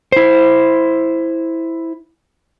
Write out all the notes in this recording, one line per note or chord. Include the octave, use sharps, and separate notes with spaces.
E4 C5